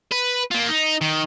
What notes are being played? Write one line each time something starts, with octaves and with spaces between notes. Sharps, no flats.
B4
A#3 F4
D#4
D#3